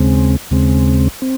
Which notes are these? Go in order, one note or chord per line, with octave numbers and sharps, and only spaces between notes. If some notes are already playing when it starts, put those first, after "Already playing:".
Already playing: D#2 C#3 G#3 C4
D#2 C#3 G#3 C4
C4